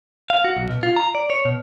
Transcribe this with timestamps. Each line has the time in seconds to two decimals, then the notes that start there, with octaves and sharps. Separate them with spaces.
0.30 F5
0.44 F#4
0.57 B1
0.69 B2
0.83 F4
0.96 A#5
1.15 D5
1.30 C#5
1.45 B2